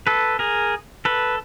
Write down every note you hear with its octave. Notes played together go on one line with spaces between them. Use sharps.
A4 B4
G#4 A#4
A4 B4